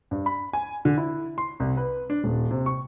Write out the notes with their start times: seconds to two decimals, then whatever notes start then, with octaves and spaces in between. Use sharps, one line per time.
0.11 G2
0.26 B5
0.53 G#5
0.85 D3
0.98 E4
1.38 C6
1.60 C2
1.77 B4
2.10 D4
2.24 D#1
2.51 C3
2.66 C#6